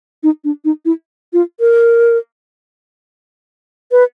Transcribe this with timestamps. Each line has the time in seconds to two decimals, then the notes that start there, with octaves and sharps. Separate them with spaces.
0.23 D#4
0.44 D4
0.64 D#4
0.85 E4
1.33 F4
1.60 A#4
3.91 B4